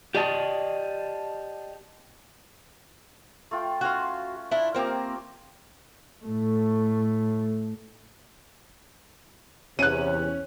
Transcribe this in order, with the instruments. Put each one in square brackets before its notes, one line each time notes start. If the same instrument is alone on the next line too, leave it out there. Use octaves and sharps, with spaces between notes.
[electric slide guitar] G4 D5 D#5 A5
[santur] A3 F4 G5
[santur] C#4 C6 [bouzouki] F#4 F5
[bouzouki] D4 E4
[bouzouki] A#3 C4 A#4 [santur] F4 G4
[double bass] A2 A3
[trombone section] E2 C3 [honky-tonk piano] C#4 [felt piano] F#6 D#7